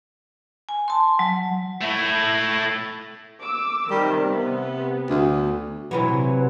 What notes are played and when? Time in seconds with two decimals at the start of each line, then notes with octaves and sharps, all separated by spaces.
0.69 G#5
0.88 A5 C6
1.19 F#3
1.81 A3 E4
3.40 D6 E6
3.90 C3 D#3 G3
4.30 C3 B3
5.09 D2
5.91 C3 E3 F#3